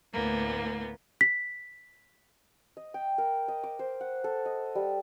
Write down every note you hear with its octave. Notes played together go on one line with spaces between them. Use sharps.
D2 A2 A#3 B3
B6
D#5
G5
A#4
D#5
D6
C5
F#5
A4
D#5
G3